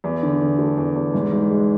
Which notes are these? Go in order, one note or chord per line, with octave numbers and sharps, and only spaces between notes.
E2
D3
D3
A3
E2
E2
G#2
G#2
G#3